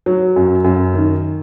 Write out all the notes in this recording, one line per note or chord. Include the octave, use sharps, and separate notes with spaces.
F#3
F#2
F#2
D#3